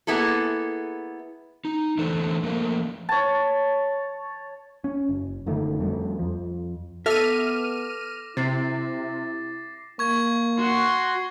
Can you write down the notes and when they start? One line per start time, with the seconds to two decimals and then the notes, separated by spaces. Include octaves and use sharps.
0.07 A#3 B3 E4 G#4 A4
1.65 D#4
1.98 D3 E3 A3 D4 A4 C5
2.43 F3 A3 A#3 A#4
3.09 C#5 A5
4.84 C#4
5.09 F#1
5.47 F#1 D3 D#3 A3
5.79 F2 G3 A3
6.19 F2 F3
7.06 B3 A4 E5 D6 F6 A#6 D#7
8.37 C3 E4 A6 C7
9.99 A#3 C#6 G#6
10.59 F#4 C6